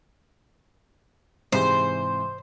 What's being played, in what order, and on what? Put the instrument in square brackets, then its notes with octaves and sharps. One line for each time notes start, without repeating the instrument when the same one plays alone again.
[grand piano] G#2 C3 E3 [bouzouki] C5